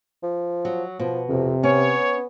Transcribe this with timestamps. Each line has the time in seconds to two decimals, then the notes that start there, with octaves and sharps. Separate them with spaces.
0.23 F3
0.65 F#3
1.00 B2 F3
1.29 F2 C3
1.63 B3 C#4 C#5